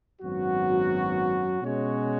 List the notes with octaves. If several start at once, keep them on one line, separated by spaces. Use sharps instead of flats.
G#1 F#2 F#3 B3 F#4
B2 G#3 C#4 F#4 C#5